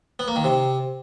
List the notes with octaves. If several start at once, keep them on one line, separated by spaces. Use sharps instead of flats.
B3
A#3
D#3
C3